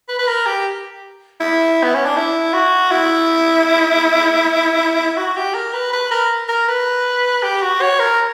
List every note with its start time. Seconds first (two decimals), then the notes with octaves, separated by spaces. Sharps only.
0.09 B4
0.19 B4
0.27 A#4
0.46 G4
1.40 E4
1.83 B3
1.95 C#4
2.06 D4
2.17 E4
2.53 F#4
2.91 E4
5.17 F#4
5.37 G4
5.55 A#4
5.73 B4
5.93 B4
6.11 A#4
6.49 A#4
6.68 B4
7.43 G4
7.62 F#4
7.81 C#5
7.99 A#4